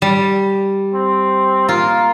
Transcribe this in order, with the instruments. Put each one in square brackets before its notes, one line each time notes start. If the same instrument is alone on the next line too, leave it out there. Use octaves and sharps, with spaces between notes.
[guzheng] G3
[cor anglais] C4
[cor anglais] A#3 [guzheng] F4